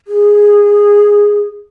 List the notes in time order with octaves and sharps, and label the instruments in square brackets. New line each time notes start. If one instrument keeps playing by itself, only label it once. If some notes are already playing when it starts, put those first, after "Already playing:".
[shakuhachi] G#4